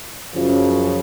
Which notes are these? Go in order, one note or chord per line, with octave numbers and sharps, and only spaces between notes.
F#2 C#3 F3